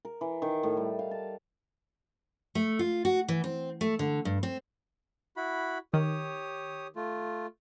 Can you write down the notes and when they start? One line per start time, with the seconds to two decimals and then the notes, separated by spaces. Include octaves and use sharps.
0.05 A#4
0.21 E3
0.42 D#3
0.63 A2
0.77 G3
0.99 F5
1.11 A5
2.55 A3
2.79 F4
3.05 F#4
3.28 E3
3.44 C4
3.81 A3
3.99 D3
4.25 G2
4.43 C4
5.37 E4 F#4 B5
5.94 D#3 G4 C#5 D#6
6.96 A3 F4